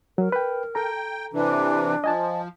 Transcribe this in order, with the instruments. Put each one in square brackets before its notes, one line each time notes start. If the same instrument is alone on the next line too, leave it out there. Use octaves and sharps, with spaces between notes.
[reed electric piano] F#3 [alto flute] A#4
[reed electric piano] B4 G5
[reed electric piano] A4 A#5 [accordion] G5
[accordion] C3 E3 [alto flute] D4
[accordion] F3 [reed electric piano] D#5 G#5 A5